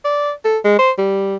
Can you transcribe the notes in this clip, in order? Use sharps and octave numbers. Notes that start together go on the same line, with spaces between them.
D5
A4
G#3
C5
G3